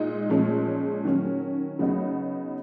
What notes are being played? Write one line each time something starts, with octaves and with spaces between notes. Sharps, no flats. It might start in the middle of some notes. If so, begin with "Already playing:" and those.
Already playing: A#2 G#3 D#4
A#2 F3 G#3 C#4
D#3 F#3 C#4
C#3 F#3 B3 D#4